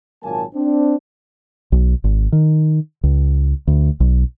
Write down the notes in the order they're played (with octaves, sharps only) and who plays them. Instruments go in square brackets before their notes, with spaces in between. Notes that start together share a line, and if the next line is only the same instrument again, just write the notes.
[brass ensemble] G#1 A#2 F#3 A#3 G#5 A5
C4 D4
[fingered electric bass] B1
G#1
D#3
C#2
D2
B1